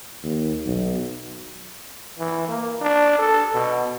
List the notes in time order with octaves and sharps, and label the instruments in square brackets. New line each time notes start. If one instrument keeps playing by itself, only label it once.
[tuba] D#2
B1
[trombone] E3
A#3
D4
A4
B2